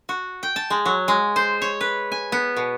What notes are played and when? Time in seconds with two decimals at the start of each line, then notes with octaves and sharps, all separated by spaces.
0.09 F#4
0.43 G5
0.56 A5
0.70 G#3
0.86 F#3
1.08 G#3
1.36 C5
1.62 C#5
1.81 B4
2.12 G#5
2.32 B3
2.57 B2